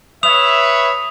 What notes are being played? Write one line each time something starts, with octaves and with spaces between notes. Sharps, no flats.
B4 C#5 E5 D#6 F7